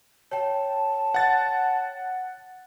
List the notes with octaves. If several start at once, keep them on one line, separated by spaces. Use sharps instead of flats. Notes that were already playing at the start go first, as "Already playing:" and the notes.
C#5 G5 A5
F#5 A6